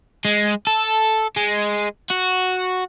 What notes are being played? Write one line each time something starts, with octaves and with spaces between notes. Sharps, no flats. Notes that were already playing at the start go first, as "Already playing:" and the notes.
G#3
A4
G#3
F#4